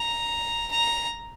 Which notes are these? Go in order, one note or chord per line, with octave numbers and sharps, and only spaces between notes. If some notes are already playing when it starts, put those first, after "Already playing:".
Already playing: A#5
A#5